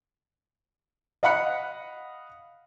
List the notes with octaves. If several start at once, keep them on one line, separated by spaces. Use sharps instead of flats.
D#5 F5 F#5 B5 F#6 C#7